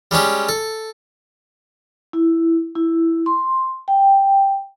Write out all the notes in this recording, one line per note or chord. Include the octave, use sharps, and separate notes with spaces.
G3 G#3 C#4 G4
A4
E4
E4
C6
G5